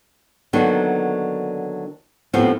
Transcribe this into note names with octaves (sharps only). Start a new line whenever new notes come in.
D3 D#3 F#3 A#3 B3 D4
D#2 A2 F3 B3 C4